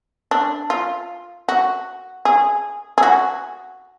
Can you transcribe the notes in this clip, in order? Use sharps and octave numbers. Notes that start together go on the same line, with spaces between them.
D4
F4
F#4
G#4
G#4
F#4